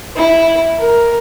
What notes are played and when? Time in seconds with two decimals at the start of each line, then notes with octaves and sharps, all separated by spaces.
0.16 E4
0.78 A#4